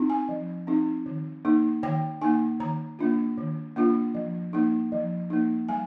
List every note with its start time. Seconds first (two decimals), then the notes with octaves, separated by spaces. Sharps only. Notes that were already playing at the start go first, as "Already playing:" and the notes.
Already playing: C4 D#4
0.10 G#5
0.29 F3
0.67 C4 D#4
1.06 D#3
1.45 A#3 D#4
1.83 D#3 G5
2.22 A#3 D#4 G#5
2.60 D#3 A#5
2.99 A#3 D4 F4
3.38 D#3
3.76 A#3 D4 F4
4.14 F3
4.53 A#3 D#4
4.92 F3
5.30 A#3 D#4
5.69 G3 G#5